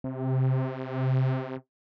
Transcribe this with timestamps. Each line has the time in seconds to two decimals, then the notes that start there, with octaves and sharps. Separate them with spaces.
0.04 C3